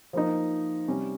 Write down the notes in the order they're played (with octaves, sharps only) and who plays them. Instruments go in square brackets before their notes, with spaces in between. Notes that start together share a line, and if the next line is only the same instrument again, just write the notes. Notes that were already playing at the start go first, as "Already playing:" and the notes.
[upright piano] F3 A#3 D#4
C3 G3 C#4